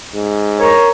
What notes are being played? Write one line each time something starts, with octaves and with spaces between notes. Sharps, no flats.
G#2
A#4 C#5 A#5